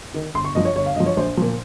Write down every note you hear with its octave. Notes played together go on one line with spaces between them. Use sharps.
D#3
G1 C6
C#6
G2 F3 D#5
C#5
G1 C#5
F5
G2 F3 D#5
C#5
A#1 C5
A#2 F3